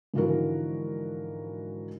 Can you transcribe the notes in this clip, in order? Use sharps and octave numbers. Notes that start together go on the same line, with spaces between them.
G#2 D3 E3 F3 F#4 A#4